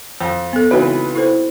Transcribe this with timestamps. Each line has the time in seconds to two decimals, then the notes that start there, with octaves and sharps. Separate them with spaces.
0.21 F2
0.53 B3 A4
0.71 C#2 E3 C4 D#4 F#4 B4
1.15 E4 A4 C5